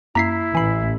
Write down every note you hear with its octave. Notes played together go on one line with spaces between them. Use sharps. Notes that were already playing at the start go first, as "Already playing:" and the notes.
F#2 A#3 E4 A#5 B6 C7
A1 E3 G#5 B5 C7